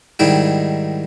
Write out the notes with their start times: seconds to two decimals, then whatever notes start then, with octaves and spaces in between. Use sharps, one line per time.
0.19 G#2 D#3 G3 E4 G5